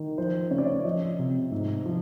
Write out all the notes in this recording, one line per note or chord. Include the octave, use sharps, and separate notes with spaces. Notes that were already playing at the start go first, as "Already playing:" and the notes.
Already playing: D#3
F3 C5
C#3 C#5
D5
C#5
F3 D#5
C3
G#2
F3